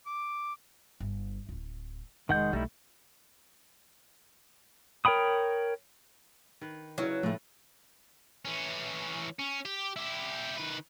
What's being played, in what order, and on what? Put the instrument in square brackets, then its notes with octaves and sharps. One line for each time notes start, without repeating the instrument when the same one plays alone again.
[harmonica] D6
[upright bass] G1
D1 E4
[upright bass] F1 [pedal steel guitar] D#3 F#5 G6 [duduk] G#3
[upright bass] B1 [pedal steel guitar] G3 D#4 E4 [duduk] A3
[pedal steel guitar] A#4 C#5 G5 B5 D#6
[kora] D#3 B4
[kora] C#3 C#4 [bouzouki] F#3 [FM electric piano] E4 B4
[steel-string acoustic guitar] A2 A3 [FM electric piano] F3 [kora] A4 B4
[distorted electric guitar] E3 C#4
C#4
G4
E4 G4
D#3 B4